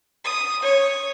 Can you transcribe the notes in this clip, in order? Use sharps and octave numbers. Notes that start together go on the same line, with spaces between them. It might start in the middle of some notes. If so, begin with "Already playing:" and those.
D#6
C#5